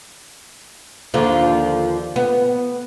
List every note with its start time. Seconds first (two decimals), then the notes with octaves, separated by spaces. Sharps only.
1.14 D#2 D3 F3
2.16 B3